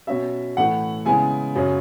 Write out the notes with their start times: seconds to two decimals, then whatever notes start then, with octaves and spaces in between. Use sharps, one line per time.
0.07 B2 F#3 C#4 E5
0.57 A2 E3 A3 F#5
1.05 C#3 G#3 B3 E4 G#5
1.55 F#2 C#3 F#3 C#4